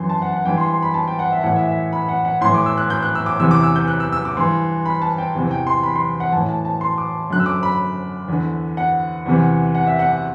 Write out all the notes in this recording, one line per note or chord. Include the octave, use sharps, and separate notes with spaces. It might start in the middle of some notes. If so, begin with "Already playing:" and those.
Already playing: F#2 E3 C6
A5
F#5
F#5
G2 E3 G5
C6
C6
B5
A5
G5
F#5
E5
A2 E3 F#5
E5
E5
B5
F#5
F#5
A2 E3 C6
D6
E6
F#6
G6
F#6
E6
D6
E2 C3 E3 E6
D6
E6
G6
F#6
E6
E6
D6
G2 E3 C6
B5
A5
G5
E2 C3 E3
G5
C6
B5
C6
F#5
A2 E3 A5
A5
A5
C6
D6
F#2 D3 F#6
E6
D6
B5
E2 D3
F#5
E2 C3 E3
F#5
E5
F#5
F#5